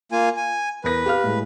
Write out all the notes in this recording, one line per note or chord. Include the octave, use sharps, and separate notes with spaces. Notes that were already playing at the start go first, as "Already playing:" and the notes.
A#3 F4 G#5
G#5
E2 A#4 B4 A#6
G4 F5 F6
A2 G#3